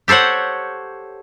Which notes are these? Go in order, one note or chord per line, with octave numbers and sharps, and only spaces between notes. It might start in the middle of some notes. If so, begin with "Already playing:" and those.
G4 A4 C5 C#5 F#5